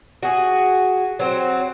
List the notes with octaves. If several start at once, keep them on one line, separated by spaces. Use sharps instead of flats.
F#4 G#4
F#3 C4